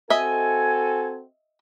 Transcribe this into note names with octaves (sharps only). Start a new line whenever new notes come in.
C4 F#4 A4 D#5 E5 G#5